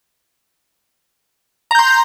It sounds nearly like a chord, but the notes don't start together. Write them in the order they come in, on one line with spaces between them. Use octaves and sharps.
A#5 G6 C6